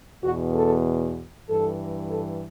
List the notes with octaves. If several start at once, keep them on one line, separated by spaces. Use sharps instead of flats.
E2 B2 F#4
A4
G2 E3 A4
A4